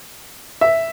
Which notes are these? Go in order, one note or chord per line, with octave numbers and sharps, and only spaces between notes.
E5